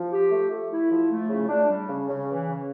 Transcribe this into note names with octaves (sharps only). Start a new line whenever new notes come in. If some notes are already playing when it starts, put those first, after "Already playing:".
Already playing: F3
G4
A3
A3
E4
F3
A3
C#3
D4
G3
C#3
C#3
E3
C#3